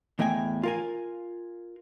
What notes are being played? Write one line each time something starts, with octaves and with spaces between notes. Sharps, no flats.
E2 A2 D#5 G5 G#5
F4 A#4 G#5